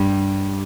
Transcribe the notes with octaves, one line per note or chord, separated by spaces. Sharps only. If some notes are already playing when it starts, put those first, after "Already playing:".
Already playing: G2 G3